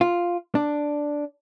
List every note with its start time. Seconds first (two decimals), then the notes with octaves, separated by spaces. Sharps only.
0.01 F4
0.55 D4